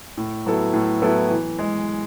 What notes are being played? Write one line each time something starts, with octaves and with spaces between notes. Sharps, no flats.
A2
F#3 B3 E4 A4
A2
F#3 B3 E4 A4
E3
G#3